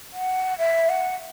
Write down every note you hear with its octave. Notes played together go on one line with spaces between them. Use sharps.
F#5
E5
F#5